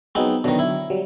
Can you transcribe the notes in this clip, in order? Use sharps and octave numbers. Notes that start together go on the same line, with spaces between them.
F#3 B3 C4 D#4 G#4
B2 D3 D#3 F#3 D4
E4
F#3 G3